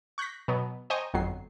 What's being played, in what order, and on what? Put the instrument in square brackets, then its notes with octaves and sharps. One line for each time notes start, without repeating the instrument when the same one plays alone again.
[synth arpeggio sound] C#6 F#6 G6 A#6 B6
B2 F#3 B3
C5 D#5 G5 G#5 A#5 C#6
G1 F2 F#3 C7